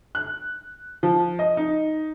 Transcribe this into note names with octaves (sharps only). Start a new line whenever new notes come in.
F#6
F3
D#5
D#4